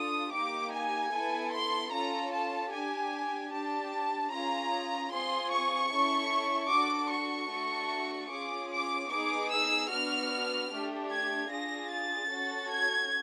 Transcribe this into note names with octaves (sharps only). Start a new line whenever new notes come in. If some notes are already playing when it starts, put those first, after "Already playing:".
Already playing: D4 F4 A4 D#6
A#3 D#4 G4 D6
G#5
B3 E4 A4
C6
C#4 F4 A4 A#5
A5
D4 G4 G#5
D4 G4 A5
C#4 F4 G#4 A#5
C4 F4 G#4 C6
C#6
C#4 E4 A4
D4 F#4 A4 D6
C#6
A3 D4 F#4 A4
C#4 F4 G#4 D6
D6
B3 D#4 G#4 D6
E6
B3 D4 F#4 F6
A3 D4 G4
G#6
D4 F4 G#4 A#6
A6
C#4 F#4 A4
G#6